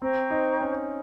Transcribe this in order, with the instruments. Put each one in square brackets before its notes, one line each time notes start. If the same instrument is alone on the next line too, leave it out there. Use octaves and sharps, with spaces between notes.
[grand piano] C4 [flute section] C5 G5 A#5 C#6
[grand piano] D#4
C#4